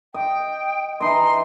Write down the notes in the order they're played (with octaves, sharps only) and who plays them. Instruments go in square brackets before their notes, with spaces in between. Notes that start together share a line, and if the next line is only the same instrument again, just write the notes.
[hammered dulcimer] D#5 [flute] G5
[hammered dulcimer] E3 D#4 D#5 [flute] C6